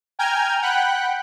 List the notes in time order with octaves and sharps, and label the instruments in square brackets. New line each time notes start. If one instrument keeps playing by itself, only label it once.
[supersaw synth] G5 G#5 A#5 F6 G6 G#6
F#5 G5 B5 F#6